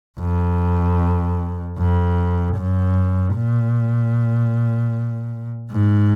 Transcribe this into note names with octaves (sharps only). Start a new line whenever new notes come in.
F2
F2
F#2
A#2
G#2